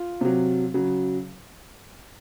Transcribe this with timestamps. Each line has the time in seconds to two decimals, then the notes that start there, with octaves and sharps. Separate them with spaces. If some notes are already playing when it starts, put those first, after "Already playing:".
Already playing: F4
0.21 C3 F#3
0.74 C#3 F#3